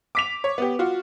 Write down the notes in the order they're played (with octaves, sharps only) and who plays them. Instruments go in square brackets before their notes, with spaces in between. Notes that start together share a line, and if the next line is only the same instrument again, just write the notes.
[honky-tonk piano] D6 B6 F7
C#5
B3 G4
F4 F#4